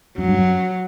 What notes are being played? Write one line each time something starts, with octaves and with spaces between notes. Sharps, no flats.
F#2 F#3
G2
F#2